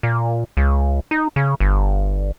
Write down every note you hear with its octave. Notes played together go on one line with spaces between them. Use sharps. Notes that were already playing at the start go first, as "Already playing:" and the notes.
A#2
C#2
D#4
C#3
G1